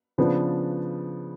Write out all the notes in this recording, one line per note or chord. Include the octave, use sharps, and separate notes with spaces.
C#3 F3 B3 D4